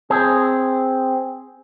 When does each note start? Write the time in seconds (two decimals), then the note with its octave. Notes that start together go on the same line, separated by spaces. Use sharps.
0.10 C4 G#4